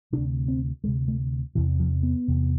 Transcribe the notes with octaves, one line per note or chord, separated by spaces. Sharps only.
D2 C3 D4
C4
D2 C3 G#3
A3
E2 C3 E3
F3
B3
E2 C3